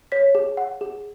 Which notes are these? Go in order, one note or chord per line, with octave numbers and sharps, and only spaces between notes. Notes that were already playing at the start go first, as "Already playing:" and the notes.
C#5 B6
G#4
F#5
G#4